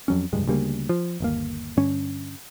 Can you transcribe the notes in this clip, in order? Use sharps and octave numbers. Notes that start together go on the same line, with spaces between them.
F2 F#3 C#4
F1 C#2 G2 G#3
D2 C#3 G3 A#3
F3
G1 D#2 A#3
G2 D3 C#4